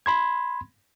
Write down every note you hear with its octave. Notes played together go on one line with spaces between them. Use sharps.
B5 C6 G#6